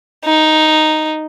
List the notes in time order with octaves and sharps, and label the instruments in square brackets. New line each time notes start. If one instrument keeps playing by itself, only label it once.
[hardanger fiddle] D#4